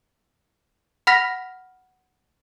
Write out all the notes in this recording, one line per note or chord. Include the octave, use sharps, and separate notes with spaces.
F#5 B5 F6 A#6 B6